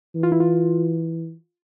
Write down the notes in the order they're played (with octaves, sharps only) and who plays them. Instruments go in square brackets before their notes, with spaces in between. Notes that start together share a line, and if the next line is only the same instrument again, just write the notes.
[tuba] E3
[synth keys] F4
E4
F4